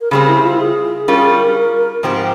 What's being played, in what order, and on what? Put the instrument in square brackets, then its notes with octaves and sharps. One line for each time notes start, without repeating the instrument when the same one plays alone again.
[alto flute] A#4
[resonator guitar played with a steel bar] C#3 G3 C4 G4 C5 [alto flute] G#4
[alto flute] E4
F4
G#4
[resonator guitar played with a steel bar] G3 C#4 F4 [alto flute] A#4
[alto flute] G#4
A#4
[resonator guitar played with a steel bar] G#2 F3 C4 G4